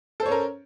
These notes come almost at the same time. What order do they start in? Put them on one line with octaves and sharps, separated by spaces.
A4 C5 C#5 C#4 A#4